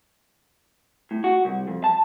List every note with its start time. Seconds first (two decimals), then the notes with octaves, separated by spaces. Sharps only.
1.11 A2
1.24 F#4
1.45 C2
1.68 F2
1.84 A5